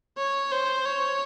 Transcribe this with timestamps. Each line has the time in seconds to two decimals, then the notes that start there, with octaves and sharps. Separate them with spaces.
0.17 C#5
0.52 C5
0.85 C#5